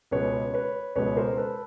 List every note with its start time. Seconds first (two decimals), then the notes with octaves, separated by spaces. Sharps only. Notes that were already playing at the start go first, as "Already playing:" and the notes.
0.11 C#2 B2 G#3 B4 C#5
0.54 B4 C#5
0.96 C#2 B2 G#3 B4 C#5
1.17 A#4 C5
1.37 A4 B4